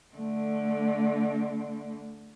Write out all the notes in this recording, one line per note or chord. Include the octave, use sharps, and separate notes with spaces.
D3 A3